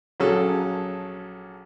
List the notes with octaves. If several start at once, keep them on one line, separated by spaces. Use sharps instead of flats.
A#1 F#3 C#4 G#4 A4